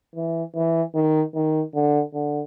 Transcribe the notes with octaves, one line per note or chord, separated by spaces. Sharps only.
E3
E3
D#3
D#3
D3
D3